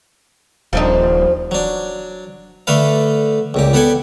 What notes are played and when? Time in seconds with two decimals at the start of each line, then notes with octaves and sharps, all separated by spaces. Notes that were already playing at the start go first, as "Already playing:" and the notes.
0.73 D#1 F3 D4 D#4
1.51 F#3 D4
2.67 D3 A3 A4 B4 F5
3.54 C#2 A#2 G4
3.73 B3 G4 A4 D5 F#5 G#5